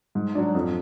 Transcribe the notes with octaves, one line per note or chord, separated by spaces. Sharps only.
G#2
F#3 D4
F2